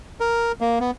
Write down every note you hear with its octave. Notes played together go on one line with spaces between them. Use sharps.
A#4
A#3
B3